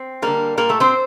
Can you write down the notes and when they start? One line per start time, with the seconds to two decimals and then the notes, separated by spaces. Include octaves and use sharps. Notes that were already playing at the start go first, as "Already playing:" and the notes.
Already playing: C4
0.22 D3 G3 A#3 A#4
0.57 A#2 G3 A#3 A#4
0.69 A3 A4
0.80 C4 C5